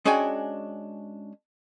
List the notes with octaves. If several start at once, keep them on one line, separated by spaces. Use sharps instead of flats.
G#3 C#4 D4 F#4 G5 G#5